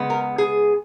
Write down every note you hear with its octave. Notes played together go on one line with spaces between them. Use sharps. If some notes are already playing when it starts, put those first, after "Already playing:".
Already playing: C#3 G#3 B3
A#4
G#4